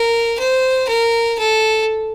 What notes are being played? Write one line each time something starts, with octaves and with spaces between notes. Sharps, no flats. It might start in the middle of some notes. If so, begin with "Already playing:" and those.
Already playing: A#4
C5
A#4
A4